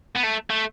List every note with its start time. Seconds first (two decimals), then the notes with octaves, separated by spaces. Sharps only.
0.15 B3
0.23 A3
0.50 A3